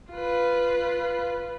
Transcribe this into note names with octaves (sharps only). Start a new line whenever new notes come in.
F4 B4